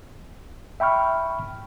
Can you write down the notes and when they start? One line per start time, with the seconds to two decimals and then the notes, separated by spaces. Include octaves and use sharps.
0.80 E5 G5 B5 C#6 F6